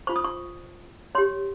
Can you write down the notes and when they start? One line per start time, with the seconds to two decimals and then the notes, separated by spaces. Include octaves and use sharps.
0.07 F4 C5 C#6
0.16 D#6
0.24 C#6
1.15 G4 C#5 C6